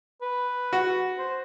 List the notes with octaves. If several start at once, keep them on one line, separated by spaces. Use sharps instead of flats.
B4
F#4
C5